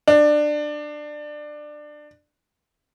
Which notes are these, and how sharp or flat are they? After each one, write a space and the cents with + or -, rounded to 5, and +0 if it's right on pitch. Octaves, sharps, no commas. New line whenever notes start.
D4 +20